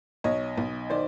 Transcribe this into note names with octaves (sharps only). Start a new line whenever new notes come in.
B1 C#5 D#5
B1
D#3 C5 D5